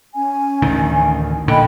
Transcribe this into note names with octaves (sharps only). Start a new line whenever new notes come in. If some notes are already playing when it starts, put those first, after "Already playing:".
C#4 G#5
A1 D2 D#3
A#1 A#2 D3 D#5 G5 B5